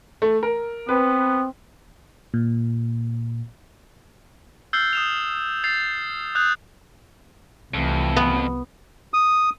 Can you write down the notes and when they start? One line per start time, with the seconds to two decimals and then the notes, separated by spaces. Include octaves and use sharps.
0.22 A3
0.43 A#4
0.89 B3 C4 B4
2.34 A#2
4.73 E6 F6 G6 A6 C7 G7
4.93 D#6 E7 F7
5.64 G6 A6 C7 F7
6.35 D#6 F#6 G6 F7
7.74 C2 F2 E3 A3 C4
8.16 B3
9.14 D#6